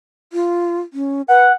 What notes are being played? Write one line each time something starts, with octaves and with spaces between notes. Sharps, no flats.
F4
C#4
B4 F#5